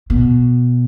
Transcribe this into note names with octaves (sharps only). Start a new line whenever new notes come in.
B2